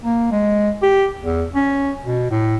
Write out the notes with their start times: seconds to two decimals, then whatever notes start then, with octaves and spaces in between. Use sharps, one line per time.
0.04 A#3
0.31 G#3
0.82 G4
1.21 E2
1.55 C#4
2.06 B2
2.31 A2